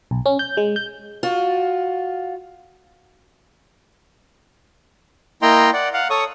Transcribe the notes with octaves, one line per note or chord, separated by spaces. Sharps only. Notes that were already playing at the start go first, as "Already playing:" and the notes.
B1
C#4
G6
G#3
G6
F4 F#4
A#3 E4 D#5 G5 A#5 C6
D5 F#5
F5 F#5
A4 C#5 C#6 D#6